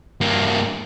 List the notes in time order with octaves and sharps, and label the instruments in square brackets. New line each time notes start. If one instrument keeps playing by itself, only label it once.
[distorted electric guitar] G2 A#3